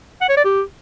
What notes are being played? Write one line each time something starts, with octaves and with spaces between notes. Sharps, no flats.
F#5
C#5
D5
G4